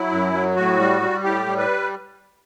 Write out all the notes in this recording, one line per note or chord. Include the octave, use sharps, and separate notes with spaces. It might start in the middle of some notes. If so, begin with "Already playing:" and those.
Already playing: F#3 E4
F#2
F#3
A2 F#4
G3
G3
A2 G4
G3
B4